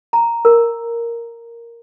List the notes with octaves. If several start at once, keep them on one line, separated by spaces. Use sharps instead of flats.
A#5
A#4